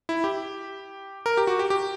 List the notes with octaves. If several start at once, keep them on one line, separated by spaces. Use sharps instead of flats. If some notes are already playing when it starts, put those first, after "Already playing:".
E4
G4
A#4
G4
F#4
G4
G4